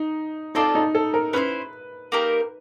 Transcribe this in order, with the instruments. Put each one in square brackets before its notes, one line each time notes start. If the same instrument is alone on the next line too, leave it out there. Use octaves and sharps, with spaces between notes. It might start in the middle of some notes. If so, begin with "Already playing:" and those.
Already playing: [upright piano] D#4
[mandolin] C4 F4 A4 D5 [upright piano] D#4
[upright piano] D#4
A4
A#4
[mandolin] C#4 E4 A4 C5 [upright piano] B4
[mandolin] A#3 D#4 G4 A#4